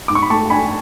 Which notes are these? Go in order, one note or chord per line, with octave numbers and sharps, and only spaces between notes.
G#2 D6
C#6
B5
A3 A5 C#6
D4 G#5 B5